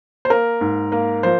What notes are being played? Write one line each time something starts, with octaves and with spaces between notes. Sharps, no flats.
C5
A#3 A#4
G#2
A#3
F3 C5